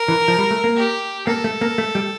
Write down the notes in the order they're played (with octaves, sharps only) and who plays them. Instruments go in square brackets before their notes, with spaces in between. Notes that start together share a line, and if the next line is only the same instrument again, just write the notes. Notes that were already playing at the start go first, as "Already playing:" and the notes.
Already playing: [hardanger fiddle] A#4
[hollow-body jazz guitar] E3
F3
G3
A3
A#3
[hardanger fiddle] G4
[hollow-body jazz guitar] A#3 [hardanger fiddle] A4
[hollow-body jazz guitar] A3
A#3
A3
G3